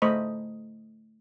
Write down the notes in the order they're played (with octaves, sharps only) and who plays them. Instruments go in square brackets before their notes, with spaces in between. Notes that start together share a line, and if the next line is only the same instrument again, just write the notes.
[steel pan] A3 C5 D#5 B5